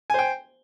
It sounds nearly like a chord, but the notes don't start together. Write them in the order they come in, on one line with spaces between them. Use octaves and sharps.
G#5 C5 G5